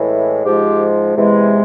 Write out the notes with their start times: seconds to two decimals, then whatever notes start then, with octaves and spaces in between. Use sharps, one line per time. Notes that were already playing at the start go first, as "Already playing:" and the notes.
Already playing: A2 E3 G#3
0.44 G#2 F3 G#3 G4
1.15 E2 C3 E3 G#3